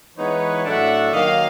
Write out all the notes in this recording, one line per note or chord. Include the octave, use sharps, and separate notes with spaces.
E3 G#3 B3 D#4 B4 C#5
A2 F#3 A3 D4 E5 F#5
D#3 F#3 A#3 D#5 F5